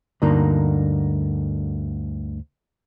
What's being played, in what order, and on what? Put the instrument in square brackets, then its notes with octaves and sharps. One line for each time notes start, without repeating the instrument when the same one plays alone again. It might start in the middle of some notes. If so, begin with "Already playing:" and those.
[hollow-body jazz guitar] D2 G2 D3 A#3 D#4